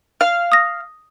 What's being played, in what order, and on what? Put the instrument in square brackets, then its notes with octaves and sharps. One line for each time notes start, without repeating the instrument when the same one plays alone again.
[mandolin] F5
[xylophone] D#6 A#6